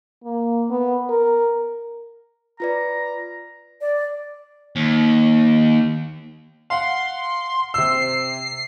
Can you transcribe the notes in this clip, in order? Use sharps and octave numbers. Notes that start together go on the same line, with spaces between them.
A#3
B3
A#4
F4 B4 D5 A#5
D5
D#2
F5 F#5 C6
C3 E6 C7